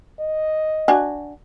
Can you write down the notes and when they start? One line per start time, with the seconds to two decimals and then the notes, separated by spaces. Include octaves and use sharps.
0.20 D#5
0.88 D4 F#4 G#5